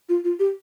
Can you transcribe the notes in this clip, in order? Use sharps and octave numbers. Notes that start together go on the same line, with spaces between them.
F4
F4
G4